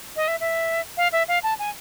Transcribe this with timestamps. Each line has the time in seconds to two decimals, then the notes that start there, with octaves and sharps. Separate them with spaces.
0.16 D#5
0.28 E5
0.40 E5
0.97 F5
1.12 E5
1.28 F5
1.43 A5
1.59 G#5